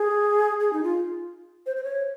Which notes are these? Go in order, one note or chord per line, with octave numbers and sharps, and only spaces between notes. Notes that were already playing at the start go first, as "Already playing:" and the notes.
Already playing: G#4
G#4
D#4
F4
C5
C5
C#5